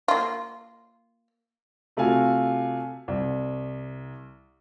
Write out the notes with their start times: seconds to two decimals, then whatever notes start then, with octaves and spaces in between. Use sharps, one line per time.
0.08 A#3 F4
1.97 C3 A3 F4 F#4 F5 G#5
3.08 C2